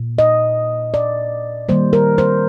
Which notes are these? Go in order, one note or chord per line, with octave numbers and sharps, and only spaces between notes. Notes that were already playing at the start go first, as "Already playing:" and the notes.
Already playing: A#2
D#5
D5
D#3 G3 A#3 C5
A#4
C5